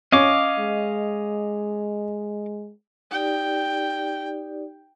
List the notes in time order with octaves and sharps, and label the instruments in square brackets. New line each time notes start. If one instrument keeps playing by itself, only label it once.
[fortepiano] C#4 [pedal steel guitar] D#5 F5 D6
[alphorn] G#3
[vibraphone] D#4 G4 D5 [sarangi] G5